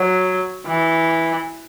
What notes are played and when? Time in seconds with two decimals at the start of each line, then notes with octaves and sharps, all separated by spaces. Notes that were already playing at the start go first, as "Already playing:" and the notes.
Already playing: F#3
0.67 E3